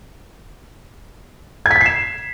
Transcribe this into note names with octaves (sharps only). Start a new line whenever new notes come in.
G#6
B6
G#6
C7
E7